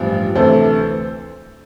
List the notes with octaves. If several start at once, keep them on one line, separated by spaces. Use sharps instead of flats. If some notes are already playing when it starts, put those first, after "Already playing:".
Already playing: A1 G2 F3
D2 C3 E3 A4 C5